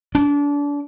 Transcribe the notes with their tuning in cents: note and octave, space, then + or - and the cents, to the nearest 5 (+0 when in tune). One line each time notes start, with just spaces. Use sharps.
D4 -30